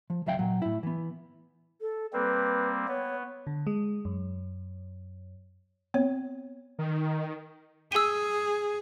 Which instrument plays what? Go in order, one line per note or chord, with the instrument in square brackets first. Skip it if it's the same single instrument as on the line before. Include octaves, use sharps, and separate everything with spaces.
[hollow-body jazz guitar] F3
C#2 F#3 E5 F5 G5
A#2 F#3
A2 E4
E3 B3
[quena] A4
[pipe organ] G3 A#3 C4 [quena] B4
[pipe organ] B3 [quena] C#5
[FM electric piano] D3
G#3
F#2
[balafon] B3 C4 C#5
[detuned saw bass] D#3
[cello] G#4 [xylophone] E6 D#7